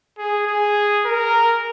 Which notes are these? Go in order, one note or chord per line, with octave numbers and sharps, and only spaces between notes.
G#4
G#4
A#4